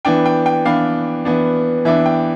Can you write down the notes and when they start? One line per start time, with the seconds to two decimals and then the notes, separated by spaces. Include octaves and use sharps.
0.05 E3 B3 D4 G5
0.25 G5
0.46 G5
0.65 E3 B3 D4 F5
1.25 E3 B3 D4
1.85 E3 B3 D4 E5
2.05 G5